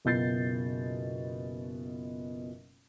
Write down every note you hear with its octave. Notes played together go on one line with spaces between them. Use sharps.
F#1 B2 F4 G6 A6 C7